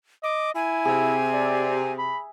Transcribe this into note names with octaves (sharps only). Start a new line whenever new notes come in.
D#5 D6
E4 G#5
C3 G#4 E5
D5
B5